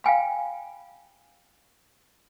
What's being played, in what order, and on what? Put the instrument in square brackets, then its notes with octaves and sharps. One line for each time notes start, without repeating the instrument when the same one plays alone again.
[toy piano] F5 G5 G#5 B5